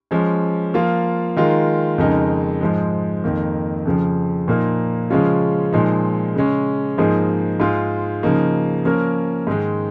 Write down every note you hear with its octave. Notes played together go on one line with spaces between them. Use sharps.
F3 G#3 C#4
F3 A#3 F4
D#3 G#3 F4 A#4
F2 C#3 G#3 D#4 A#4
G#2 F3 G#3
F2 D#3 A#3
F2 C#3 F3
A#2 F3 A#3 D#4 A#4
C#3 F3 G#3 C#4 F4
A#2 F3 G#3 D#4
C#3 G#3 C#4
G#2 F3 A#3 D#4 G#4
G#2 G#3 F4
C#3 F3 A#3 D#4
F3 A#3 C#4 A#4
G#2 D#3 G#3